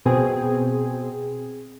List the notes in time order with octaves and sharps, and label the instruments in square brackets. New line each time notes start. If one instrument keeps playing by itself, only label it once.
[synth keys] B2 C4 G#4